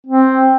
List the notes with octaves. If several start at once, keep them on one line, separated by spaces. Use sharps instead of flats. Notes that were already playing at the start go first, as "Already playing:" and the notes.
C4